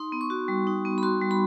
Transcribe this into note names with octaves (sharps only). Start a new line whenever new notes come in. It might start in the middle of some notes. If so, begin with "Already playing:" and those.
Already playing: D#4 C6
B3
C#6
F#4
G3
D#4
B3
B5
F#4 C6
G3
B5